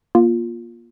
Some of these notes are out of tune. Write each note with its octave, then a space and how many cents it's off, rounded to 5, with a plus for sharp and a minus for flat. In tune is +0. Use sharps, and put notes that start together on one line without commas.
A#3 +30 F4 +0